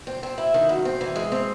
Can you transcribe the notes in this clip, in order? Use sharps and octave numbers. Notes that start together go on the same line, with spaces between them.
C4
C4
E4
D#3
F#2
C4
E3
G#3
C4